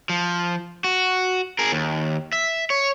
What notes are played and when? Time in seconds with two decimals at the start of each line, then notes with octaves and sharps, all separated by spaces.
0.09 F3
0.84 F#4
1.59 G#4 A#4
1.72 D#2
2.32 E5
2.70 C#5